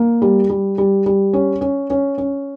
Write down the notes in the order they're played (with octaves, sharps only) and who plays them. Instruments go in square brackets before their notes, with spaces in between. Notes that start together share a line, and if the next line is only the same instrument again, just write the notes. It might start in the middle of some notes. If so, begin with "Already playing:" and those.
Already playing: [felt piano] A#3
G3
G3
G3
G3
C#4
C#4
C#4
C#4